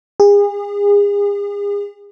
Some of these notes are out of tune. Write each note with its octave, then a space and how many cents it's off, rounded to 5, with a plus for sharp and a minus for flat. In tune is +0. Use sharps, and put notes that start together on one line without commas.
G#4 -40